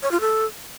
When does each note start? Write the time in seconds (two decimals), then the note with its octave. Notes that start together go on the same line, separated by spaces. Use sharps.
0.02 C#5
0.12 F4
0.21 A4